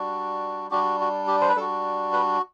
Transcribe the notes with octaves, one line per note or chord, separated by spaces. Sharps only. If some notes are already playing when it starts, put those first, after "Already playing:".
Already playing: G3 D4 F#4
G3 D4 F#4 G4
F#4
G4
C5
B4
G3 D4 F#4 A4
B4